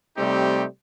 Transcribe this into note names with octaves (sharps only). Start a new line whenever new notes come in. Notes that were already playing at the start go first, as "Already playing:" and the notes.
C3 G3 A3 C4 D#4 G4